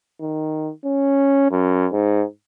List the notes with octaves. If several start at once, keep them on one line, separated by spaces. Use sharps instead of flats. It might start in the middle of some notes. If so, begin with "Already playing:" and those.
D#3
C#4
F#2
G#2